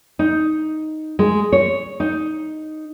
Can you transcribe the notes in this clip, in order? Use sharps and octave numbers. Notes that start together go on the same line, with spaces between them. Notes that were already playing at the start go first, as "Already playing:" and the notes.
D#4
G#3
C#5
D#4